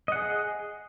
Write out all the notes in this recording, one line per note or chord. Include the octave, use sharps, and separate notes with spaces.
G#4 D#5 F#5